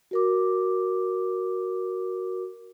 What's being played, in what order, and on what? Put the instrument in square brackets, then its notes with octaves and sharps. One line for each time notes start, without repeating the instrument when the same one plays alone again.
[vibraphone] F#4 A#4 D6